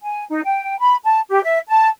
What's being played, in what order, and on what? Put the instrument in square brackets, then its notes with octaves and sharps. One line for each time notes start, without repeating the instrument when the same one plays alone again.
[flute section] G#5
D#4
G5
B5
A5
G4
E5
A5